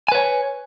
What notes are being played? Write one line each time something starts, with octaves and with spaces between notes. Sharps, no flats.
B4 C#5 G#5